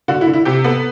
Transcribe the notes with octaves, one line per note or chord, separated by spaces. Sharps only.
D3 F#4
E4
D3
E4
C3 G4
B3 A4